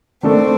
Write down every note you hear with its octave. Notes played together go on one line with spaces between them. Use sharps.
D#3 A3 C4 D4 A4